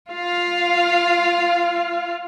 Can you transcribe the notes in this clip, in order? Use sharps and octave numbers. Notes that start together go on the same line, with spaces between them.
F4 F5